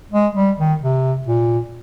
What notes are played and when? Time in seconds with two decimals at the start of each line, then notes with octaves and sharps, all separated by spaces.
0.12 G#3
0.35 G3
0.58 D#3
0.82 C3
1.27 A#2